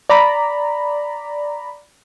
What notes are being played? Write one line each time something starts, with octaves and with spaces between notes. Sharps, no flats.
D5 A#5 B5